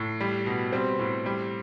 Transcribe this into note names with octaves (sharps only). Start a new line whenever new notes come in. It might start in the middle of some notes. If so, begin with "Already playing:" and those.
Already playing: A2
G3
B2
G3 C4
A2
G3